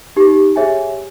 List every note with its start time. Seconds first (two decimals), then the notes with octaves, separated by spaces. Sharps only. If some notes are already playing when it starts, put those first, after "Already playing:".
0.16 D#4 G4
0.56 G#4 C#5 E5 G#5